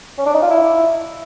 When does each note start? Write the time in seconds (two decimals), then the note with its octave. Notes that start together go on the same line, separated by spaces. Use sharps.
0.18 C#4
0.26 D4
0.34 D#4
0.42 F4
0.50 E4